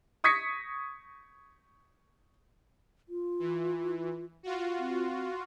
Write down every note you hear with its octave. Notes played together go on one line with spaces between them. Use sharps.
C#6 D#6 G#6 A#6 B6 C#7
F4
E3
F4 F#4
C4